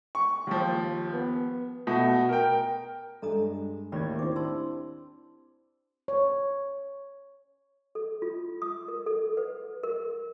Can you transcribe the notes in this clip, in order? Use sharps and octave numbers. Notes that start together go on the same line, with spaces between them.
C#6
D#2 F3
B3
B2 A3
A#4 G5
G2 G#3 A4 A#5 D#6
D#2 A2 G4 D5 B5 G#6
C4 D4 E4 G4 D6
A5 C6 E6
C#5
A4
F4
D#6
A#4
A4
B4
A#4